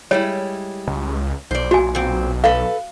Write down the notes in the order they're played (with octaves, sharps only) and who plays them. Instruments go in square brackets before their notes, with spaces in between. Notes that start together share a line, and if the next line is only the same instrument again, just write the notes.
[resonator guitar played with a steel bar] G3 G#3 E4 [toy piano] C#5
[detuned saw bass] C#2
[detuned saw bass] B1 [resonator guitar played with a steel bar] C5 D5
[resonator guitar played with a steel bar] A#2 [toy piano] F#4 G#5
[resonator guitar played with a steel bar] A#2 C4
[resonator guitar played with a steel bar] A4 B4 [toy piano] F5